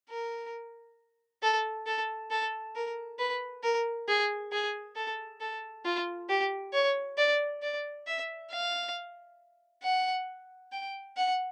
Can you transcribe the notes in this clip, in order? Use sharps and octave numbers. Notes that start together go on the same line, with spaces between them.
A#4
A4
A4
A4
A#4
B4
A#4
G#4
G#4
A4
A4
F4
G4
C#5
D5
D5
E5
F5
F#5
G5
F#5